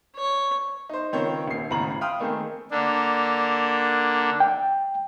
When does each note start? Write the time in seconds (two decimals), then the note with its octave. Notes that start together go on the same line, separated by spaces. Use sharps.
0.16 C#5
0.89 D#4 C5
1.13 C#2 D#3 C4 C#5
1.47 D#1 C7
1.70 G#1 A2 C#3 A#5 B5 F#7
2.01 F5 G5 B5 C6 D#6 F6
2.20 D#3 A3 A#3 C4 G#4
2.71 D3 A#3 D4
4.40 G5